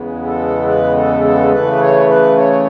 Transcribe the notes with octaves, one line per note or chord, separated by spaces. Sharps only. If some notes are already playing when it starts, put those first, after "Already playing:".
Already playing: E2 C#3 E3 G#3 B3
A4
B4
A4
A4
C#3 E3 A3 B4
B4
C#5
B4
C#5